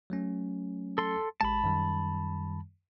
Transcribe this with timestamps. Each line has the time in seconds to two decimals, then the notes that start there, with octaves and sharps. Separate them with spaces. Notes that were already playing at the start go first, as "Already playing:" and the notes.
0.10 F#3 A3 C#4
0.98 A4 C6
1.41 A1 G#3 A5 B5
1.64 F#2 D#3 G3